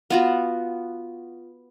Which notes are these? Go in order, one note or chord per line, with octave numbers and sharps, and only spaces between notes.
B3 F4 F#4